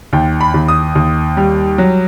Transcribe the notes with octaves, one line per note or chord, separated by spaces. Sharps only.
D#2 G5
B5
D#2
D#6
D#2
G3
F#3